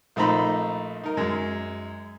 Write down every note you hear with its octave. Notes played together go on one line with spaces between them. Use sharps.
A#1 A3 D#4 C5 A#5 B5
D#4 A#4
F#2 G#3